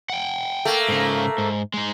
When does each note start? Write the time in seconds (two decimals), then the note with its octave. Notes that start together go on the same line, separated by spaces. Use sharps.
0.10 F#5 G5
0.65 A3 A#3
0.88 G#2 C#3
1.38 G#2
1.74 G#3 D#4